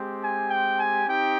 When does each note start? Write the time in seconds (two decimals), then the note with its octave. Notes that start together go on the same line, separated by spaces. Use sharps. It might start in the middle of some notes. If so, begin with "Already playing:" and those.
Already playing: G#3 C4 G4
0.21 G#5
0.49 G5
0.78 G#5
1.07 C4 D#4 G4 G5